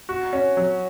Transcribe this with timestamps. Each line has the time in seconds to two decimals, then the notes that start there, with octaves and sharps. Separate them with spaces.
0.09 F#4
0.33 C#4
0.57 F#3